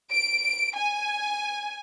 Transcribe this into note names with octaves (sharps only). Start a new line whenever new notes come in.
D7
G#5